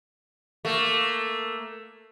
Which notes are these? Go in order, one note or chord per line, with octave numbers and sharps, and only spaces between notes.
A3 A#3